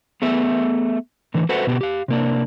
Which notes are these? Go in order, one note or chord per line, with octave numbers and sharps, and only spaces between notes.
A3 B3 G#4 E5
A2 D3 E3
F#4 A4 B4 C5 E5 F#5
B2 B3 G4
G4 F5
C3 A#3 D4